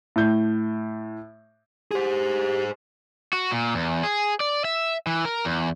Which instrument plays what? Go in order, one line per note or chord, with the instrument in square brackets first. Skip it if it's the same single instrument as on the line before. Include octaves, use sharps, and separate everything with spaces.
[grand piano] A2 G6
[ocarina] G4 [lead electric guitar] G#4 C5
[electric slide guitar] F#4
A#2
E2
G#4
D5
E5
E3
A#4
E2